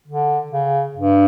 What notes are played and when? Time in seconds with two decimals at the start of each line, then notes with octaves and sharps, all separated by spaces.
0.08 D3
0.52 C#3
0.97 G2